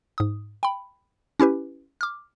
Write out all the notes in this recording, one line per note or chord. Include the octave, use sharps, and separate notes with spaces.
G#2 D#6
G5 B5
C#4 E4 G4 B4
D6 F6